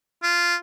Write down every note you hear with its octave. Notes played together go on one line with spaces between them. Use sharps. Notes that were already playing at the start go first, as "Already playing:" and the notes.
F4